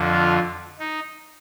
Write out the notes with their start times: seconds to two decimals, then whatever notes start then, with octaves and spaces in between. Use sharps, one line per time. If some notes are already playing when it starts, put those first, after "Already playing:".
Already playing: F2 D3 F3
0.11 F4
0.79 D#4